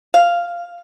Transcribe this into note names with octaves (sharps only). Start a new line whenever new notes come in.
F5